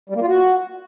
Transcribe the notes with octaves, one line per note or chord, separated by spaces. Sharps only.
G3
A#3
F4
F#4